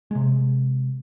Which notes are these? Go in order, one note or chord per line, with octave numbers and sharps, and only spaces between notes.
C3 G#3